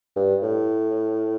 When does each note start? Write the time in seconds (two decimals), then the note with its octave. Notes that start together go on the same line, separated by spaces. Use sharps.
0.16 G2
0.42 A2